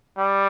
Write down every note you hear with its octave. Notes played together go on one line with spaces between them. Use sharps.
G3